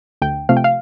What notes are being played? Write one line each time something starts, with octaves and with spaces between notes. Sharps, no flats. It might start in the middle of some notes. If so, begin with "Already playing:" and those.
D2 G5
C3 F3 A3 F5
G5
F5